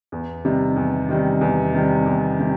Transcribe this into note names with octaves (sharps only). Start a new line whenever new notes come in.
E2
C3 D#3 G3
E2
C3 D#3 G3
E2
C3 D#3 G3
E2
C3 D#3 G3